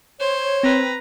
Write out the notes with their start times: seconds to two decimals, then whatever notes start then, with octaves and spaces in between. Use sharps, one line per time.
0.20 C5 C#5
0.63 C4 B4 A#5